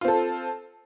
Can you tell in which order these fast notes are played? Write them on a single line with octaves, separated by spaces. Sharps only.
F4 C4 A4